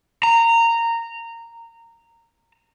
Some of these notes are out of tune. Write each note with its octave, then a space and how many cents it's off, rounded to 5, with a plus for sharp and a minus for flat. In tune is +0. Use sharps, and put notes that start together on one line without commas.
A#5 -15